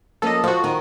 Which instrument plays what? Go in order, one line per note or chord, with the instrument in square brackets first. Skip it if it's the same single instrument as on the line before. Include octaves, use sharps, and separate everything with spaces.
[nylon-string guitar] F3 A#3 C#4 [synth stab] A4 D#5
[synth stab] F3 F#4 [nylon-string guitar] A4
[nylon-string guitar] D#3 D#4